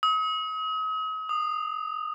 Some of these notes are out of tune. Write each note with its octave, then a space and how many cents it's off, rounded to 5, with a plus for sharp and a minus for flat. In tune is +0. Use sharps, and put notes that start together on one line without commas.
D#6 +40
D#6 -20